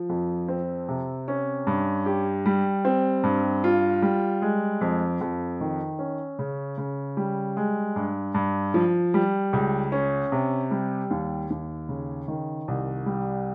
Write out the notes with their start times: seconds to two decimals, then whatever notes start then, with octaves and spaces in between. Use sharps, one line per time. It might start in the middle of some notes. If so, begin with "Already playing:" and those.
Already playing: F3
0.09 F2
0.48 C4
0.89 C3
1.28 C#4
1.67 G2
2.06 G4
2.46 G3
2.85 C4
3.23 G2
3.64 F4
4.02 G3
4.42 G#3
4.81 F2
5.21 F2
5.61 D#3
5.99 C#4
6.39 C#3
6.78 C#3
7.17 G3
7.57 G#3
7.96 G2
8.34 G2
8.74 F3
9.14 G3
9.53 C#2
9.92 C#4
10.32 C3
10.71 G3
11.10 D#2
11.50 D#2
11.89 C#3
12.28 D#3
12.68 C2
13.06 G3